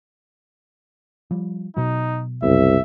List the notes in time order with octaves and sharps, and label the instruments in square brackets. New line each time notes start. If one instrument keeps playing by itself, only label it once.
[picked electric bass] F3 G3
[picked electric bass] B2 F#3 [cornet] D#4
[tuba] C2 [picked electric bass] F#2 C#3 B3 [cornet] E5